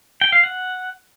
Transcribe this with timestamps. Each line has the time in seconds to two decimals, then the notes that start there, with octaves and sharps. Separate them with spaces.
0.21 G5
0.32 F5
0.43 F#5